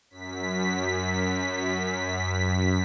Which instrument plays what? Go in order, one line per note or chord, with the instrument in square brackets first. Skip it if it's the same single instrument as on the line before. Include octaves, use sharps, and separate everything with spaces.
[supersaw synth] F#2 B6